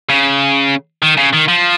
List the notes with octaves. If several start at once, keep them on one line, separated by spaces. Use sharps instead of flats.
C#3
D#3
C#3
D#3
F3